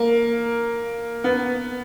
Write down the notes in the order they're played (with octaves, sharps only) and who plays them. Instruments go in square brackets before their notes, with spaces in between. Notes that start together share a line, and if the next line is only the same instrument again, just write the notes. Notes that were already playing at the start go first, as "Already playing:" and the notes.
Already playing: [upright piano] A#3
B3